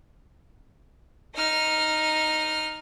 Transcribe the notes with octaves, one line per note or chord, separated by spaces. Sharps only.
D#4 F6